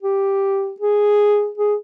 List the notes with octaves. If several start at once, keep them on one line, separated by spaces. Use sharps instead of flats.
G4
G#4
G#4